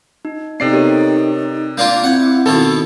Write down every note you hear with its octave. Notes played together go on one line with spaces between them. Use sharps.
D#4
C3 B3 D#4 A4 D5 C7
G4 A#4 C#5
A#3 D4 F4 G6
C4 E4 F#5 G6 G#6
B2 D#3 B3 A4